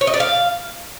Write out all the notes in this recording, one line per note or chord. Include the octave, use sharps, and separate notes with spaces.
C#5
D#5
D5
F5